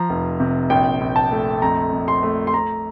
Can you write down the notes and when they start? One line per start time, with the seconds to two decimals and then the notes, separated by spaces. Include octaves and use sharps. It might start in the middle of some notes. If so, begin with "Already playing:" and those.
Already playing: F3 A#5
0.10 F1
0.40 C3
0.70 A#1 G5
1.01 A#1
1.16 A5
1.32 A3
1.62 F2 A#5
1.92 F2
2.08 C6
2.23 A3
2.47 C6
2.54 A3 A#5